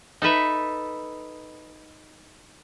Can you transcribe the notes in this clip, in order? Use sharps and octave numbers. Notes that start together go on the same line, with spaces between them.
D#4 A4 B4 E5